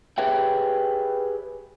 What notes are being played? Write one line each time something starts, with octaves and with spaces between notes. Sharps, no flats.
G4 G#4 B4 C#5 E5 G5